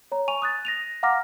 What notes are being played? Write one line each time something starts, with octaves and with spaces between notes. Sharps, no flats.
C#5 A#5
G#5 C#6 D#7 F7
D#6 F#6 A6
A#6 D#7 F7
F5 F#5 A#5 D6 F6 A#6